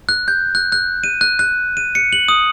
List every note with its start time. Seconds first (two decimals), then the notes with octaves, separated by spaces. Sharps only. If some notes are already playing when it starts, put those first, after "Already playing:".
0.09 F#6
0.28 G6
0.55 F#6
0.72 F#6
1.04 D#7
1.21 F#6
1.39 F#6
1.77 D#7
1.95 C#7
2.13 F#7
2.28 D#6